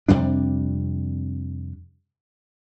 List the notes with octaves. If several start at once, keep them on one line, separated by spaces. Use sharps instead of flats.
F2 C3 G3 D4